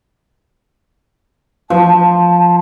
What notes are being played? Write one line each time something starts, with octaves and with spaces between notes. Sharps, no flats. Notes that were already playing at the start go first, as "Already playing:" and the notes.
F3 A5